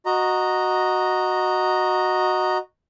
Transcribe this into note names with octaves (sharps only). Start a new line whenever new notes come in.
F#4 D#5 A#5